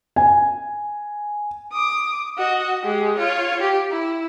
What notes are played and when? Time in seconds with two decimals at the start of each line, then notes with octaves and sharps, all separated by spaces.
0.16 G#5
1.72 D6 D#6
2.37 F#4 D#5
2.81 G#3 G4
3.17 F4 C#5
3.61 G4
3.91 E4